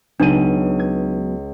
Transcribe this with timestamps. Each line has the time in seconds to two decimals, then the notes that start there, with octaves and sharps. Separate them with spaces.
0.20 C#2 F#3 B3 D4 D#4 D#7
0.79 G#6